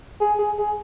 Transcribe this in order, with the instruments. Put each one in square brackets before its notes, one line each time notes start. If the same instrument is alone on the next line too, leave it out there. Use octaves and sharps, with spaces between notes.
[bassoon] G#4
G#4
G#4